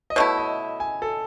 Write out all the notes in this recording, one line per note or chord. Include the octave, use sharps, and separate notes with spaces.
D#5
B2 A3 E4 C#5
D#5
G#5
A4